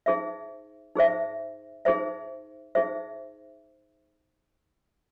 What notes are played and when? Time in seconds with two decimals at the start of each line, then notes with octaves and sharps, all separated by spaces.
0.06 D#4 G#4 C5 E5
0.96 D#4 G#4 C5 E5
1.85 D#4 G#4 C5 E5
2.75 D#4 G#4 C5 E5